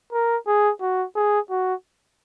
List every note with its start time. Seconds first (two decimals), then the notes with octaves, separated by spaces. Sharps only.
0.13 A#4
0.47 G#4
0.81 F#4
1.16 G#4
1.50 F#4